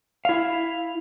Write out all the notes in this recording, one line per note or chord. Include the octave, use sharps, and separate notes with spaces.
E4 F5